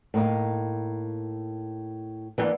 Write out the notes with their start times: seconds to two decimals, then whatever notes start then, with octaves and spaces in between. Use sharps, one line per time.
0.14 A2 A#3 D#4
2.38 E3 G3 A#3 B3 D4